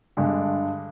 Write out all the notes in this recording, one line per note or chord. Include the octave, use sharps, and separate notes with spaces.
G2 D3 G#3